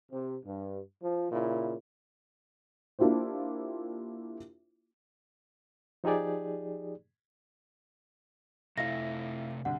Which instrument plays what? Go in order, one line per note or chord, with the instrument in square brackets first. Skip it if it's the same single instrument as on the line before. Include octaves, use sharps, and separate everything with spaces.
[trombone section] C3
G2
F3
A#2 C#3 E4
[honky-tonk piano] A#3 D4 E4 F4 G4 C5
[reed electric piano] F3 D#4 G4 G#4 D5
[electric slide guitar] C3 A3 A4 [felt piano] E4 F5 [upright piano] E5 [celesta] A#6
[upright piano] C2 D3 [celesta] F#5